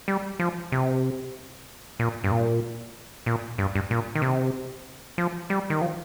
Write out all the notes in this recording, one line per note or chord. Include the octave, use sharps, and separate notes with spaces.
G3
F3
C3
A#2
G2
A#2
A#2
G2
G2
A#2
D#3
C3
F3
G3
D#3
F3